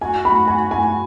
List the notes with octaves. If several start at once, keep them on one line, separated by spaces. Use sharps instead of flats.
F#4 G#5
B5
G#5
G#5